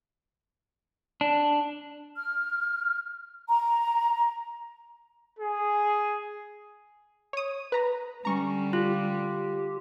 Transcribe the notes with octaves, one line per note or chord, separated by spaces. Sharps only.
D4
F6
A#5
G#4
C#5 D#6
B4 A#5
D3 G3 C#4 A#5 C#6
F4 G4